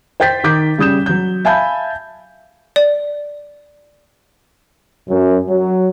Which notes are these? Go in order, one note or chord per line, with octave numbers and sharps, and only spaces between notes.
C5 G5 G6 A6 B6
D#3 D#4 D6 G6 B6
C#3 G3 D#6 G6 E7
F#3 G6
E5 F5 G#5 A5 B5 G6
D5
F#2
F#3